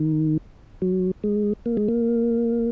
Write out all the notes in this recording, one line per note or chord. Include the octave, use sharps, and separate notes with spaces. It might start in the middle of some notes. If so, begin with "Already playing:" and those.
Already playing: D#3
F#3
G#3
A#3
G#3
A#3